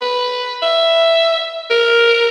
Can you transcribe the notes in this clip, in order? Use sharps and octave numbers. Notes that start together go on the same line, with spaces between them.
B4
E5
A#4